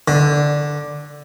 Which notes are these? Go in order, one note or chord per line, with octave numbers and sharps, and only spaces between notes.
D3